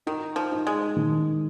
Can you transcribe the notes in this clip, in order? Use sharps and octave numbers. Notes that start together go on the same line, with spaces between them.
D#3 D#4
F3
D#4
G#3
D#3